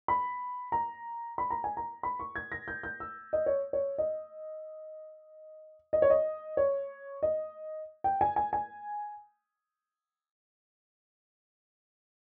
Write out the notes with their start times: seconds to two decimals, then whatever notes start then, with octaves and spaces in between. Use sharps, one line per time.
0.08 B5
0.72 A#5
1.38 B5
1.50 A#5
1.64 G#5
1.77 A#5
2.03 B5
2.20 C#6
2.36 G#6
2.52 A#6
2.68 G6
2.83 G6
3.00 E6
3.33 D#5
3.46 C#5
3.73 C#5
3.98 D#5
5.93 D#5
6.02 C#5
6.10 D#5
6.57 C#5
7.23 D#5
8.04 G5
8.21 G#5
8.36 G#5
8.53 G#5